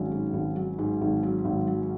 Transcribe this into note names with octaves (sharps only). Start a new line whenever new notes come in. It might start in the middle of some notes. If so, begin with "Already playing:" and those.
Already playing: G#1 F#3 C#4
G#2
G#1
F#3
G#2
G#1
F#3
G#1
F#3